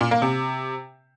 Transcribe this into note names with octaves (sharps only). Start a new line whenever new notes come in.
A#2
A#3
C3